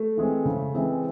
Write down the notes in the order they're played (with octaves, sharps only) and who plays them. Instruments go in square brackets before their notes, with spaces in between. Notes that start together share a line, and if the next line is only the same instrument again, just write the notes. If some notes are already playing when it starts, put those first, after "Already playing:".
Already playing: [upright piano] A3
[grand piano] E3 G#3 C4
C#3
E3 G#3 C4